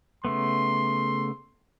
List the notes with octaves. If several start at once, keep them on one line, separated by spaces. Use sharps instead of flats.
C#3 A3 B3 C6